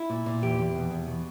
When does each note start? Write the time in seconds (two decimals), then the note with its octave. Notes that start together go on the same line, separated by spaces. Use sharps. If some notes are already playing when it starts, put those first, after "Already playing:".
Already playing: E4
0.10 A#2
0.26 A#2
0.42 E2 G4
0.58 E2
0.75 B2
0.91 E2
1.07 B2